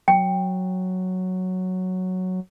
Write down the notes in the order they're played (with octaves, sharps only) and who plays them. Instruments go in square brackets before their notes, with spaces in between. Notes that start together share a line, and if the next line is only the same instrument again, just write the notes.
[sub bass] F#3 [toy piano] G5